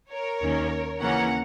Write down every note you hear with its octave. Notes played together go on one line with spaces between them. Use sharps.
A#4 C#5
D#2 D#3 A#3 C#4
D#2 C#3 E3 A#3 C#4 F#5 A#5